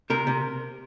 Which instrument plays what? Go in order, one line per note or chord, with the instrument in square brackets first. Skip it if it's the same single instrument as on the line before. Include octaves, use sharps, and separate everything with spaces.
[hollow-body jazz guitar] C3 A#4
C3